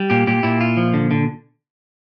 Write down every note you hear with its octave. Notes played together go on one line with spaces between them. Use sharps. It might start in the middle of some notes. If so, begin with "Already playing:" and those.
Already playing: G3
A#2 G4
A#2 G4
A#2 E4
F4
F3
D3
D3